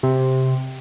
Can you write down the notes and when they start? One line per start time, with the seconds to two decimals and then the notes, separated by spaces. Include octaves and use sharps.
0.03 C3